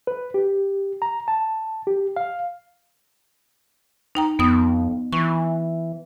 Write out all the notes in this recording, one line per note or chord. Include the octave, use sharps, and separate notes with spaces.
B4
G4
A#5
A5
G4
F5
D#4 G5 A#5
F2 B3 D#6
E3 C#6